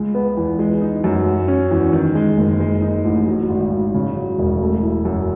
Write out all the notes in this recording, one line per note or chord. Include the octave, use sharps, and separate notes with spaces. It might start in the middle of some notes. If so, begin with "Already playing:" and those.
Already playing: C#2 G#3
B3
E2
G#3
D#4
F#2
F#3
C#4
E2
D#3
G#3
F#1
G#3
D#4
A1
F#3
G#1
G#1
C#3
F#3
E1
A3
E4
F#2